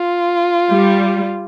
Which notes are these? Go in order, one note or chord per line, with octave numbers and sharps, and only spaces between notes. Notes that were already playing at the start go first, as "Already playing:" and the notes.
Already playing: F4
G3